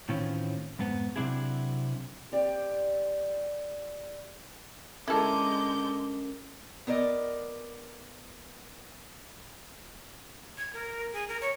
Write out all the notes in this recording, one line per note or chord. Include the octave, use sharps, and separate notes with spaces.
A2 D#3 E3 C4 C#4 F4
F2 G#2 B3
C3 F#3 C4 D4 E4 G#4
C4 G4 D5
D3 G#3 C#4 E4 A4 A#4 D6 G6
B3 A#4 C5 D5 D#5
G#6
A#4
G#4
A#4
C#5